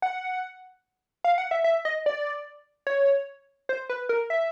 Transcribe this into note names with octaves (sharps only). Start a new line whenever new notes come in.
F#5
F5
F#5
E5
E5
D#5
D5
C#5
C5
B4
A#4
E5